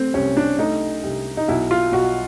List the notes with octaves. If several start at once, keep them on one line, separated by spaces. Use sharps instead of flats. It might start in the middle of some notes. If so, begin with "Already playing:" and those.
Already playing: A3 C4
C2 C#4
D4
A3 D#4
C2
D#4
B1 E4
F4
B1 F#4